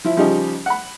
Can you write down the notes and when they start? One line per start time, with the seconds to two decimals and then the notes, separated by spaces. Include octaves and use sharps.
0.05 F3 E4
0.17 C#3 F3 G3 D#4 G4 G#4
0.66 F#5 B5